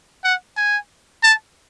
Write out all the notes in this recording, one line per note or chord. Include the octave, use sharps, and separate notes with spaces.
F#5
G#5
A5